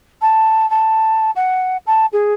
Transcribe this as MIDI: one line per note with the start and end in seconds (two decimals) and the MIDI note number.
0.21 0.69 81
0.70 1.31 81
1.36 1.77 78
1.87 2.06 81
2.13 2.34 68